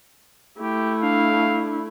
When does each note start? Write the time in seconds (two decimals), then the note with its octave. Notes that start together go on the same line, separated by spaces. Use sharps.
0.61 A3 E4 G4
1.03 D4 F5